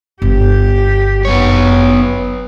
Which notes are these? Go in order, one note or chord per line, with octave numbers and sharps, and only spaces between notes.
G1 G4
F#2 B3 C#5